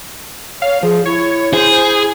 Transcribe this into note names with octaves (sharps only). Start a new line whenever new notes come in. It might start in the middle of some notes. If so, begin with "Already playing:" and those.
C#5 F5
F3 G#4
E4 C#5
G#4 C5